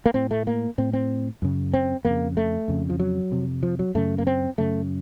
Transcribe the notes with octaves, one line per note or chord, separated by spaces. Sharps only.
A#3
A2 C4
A3
A#3
A2 C4
C4
F#2 C#3
C4
F2 C#3 A#3
A3
F2 C#3
F3
F#3
F2 C3
F3
F#3
F#2 C#3 A3
A#3
C4
F#2 C#3 A3